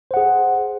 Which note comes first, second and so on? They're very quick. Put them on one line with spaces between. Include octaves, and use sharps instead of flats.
C5 F#5 G#4